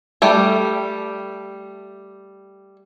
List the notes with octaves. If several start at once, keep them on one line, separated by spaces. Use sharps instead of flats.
G3 A3 G4